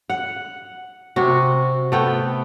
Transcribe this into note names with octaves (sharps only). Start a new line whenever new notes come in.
F#5
C3 F#4
A3 B3 G5